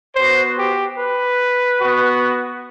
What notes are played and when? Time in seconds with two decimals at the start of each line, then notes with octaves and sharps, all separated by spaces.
0.15 B3 F#4 C5
0.57 G4
0.98 B4
1.81 B3 F#4